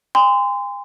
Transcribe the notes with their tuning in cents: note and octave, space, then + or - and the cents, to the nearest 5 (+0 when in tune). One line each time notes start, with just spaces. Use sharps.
G#5 -45 C6 -25